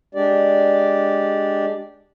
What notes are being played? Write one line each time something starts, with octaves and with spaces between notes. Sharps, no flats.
G#3 D4 G4 D5